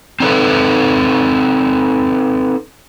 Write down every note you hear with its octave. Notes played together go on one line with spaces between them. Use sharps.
C4 D#4 A4 B4